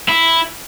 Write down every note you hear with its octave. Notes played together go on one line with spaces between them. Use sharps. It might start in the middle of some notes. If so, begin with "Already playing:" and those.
E4